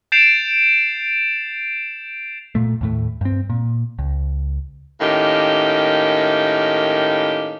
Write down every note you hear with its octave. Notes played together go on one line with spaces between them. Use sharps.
G6 A6 C7 D7 E7 F7
A#2 A3
D#2 A2 A3
G2 C4
A#2
C#2
A2 D#3 A#3 C#4 G4